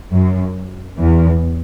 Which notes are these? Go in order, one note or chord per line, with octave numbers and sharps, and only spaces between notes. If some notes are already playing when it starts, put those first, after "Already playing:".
F#2
E2